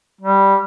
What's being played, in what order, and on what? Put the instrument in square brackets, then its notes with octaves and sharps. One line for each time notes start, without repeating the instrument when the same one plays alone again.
[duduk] G3